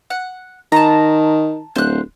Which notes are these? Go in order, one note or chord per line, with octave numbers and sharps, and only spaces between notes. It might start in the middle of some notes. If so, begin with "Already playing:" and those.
F#5
D#3 A5 A#5
D1 C5 F#6